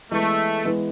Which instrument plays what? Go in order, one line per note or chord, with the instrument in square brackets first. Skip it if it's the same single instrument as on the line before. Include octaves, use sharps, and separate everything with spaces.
[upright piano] E3 G#3 B3 [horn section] A3
[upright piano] E3 G#3 B3